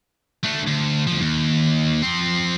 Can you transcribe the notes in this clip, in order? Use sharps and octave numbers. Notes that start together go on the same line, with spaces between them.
A3 D4
D2
D2 F3
D#2
F3 C4